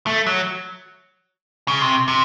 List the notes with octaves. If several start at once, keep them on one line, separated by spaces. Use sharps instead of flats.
A3
F#3
C#3
C3
C3